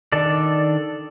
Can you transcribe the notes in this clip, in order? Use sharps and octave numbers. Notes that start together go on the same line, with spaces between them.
D#3 D4 A4 D5